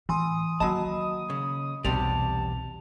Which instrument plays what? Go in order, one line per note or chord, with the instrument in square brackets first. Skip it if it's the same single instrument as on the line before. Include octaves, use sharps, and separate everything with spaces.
[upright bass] A2 [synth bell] E3 G#5 C6 [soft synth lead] D#6
[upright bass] D#3 A#3 [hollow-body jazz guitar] F#3 A5 [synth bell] D#5 B5
[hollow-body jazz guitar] C#3
[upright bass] B1 B3 [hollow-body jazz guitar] E2 C3 G3 [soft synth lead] A5 [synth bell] F7